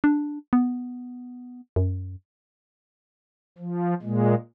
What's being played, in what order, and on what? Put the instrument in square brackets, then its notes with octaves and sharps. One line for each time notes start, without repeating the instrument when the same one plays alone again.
[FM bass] D4
B3
F#2
[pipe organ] F3
A#2 G#3